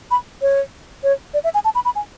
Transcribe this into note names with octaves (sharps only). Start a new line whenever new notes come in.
B5
C#5
C#5
D5
E5
G#5
A5
B5
B5
G#5